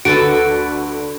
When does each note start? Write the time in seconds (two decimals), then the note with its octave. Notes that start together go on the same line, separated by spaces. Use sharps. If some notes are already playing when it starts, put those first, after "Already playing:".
0.05 D2 D3 F#4 A4 B4 D7